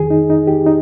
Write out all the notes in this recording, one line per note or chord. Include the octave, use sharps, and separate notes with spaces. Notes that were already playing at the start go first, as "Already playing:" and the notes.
Already playing: F2 D#3 G#4
D#4
D#4
G4
D#4